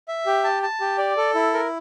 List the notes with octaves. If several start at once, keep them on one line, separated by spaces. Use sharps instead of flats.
E5
G4
A5
A5
G4
D5
A4
E4
A#4